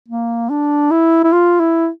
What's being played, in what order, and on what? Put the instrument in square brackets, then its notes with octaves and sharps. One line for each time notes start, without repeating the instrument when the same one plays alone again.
[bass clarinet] A#3
D4
E4
E4
F4
E4